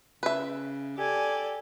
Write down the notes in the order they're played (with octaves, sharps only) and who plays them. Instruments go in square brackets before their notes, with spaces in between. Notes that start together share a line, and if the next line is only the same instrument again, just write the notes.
[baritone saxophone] C#3 [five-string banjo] B4 E5
[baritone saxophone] G4 [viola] A4 D5 [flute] G#5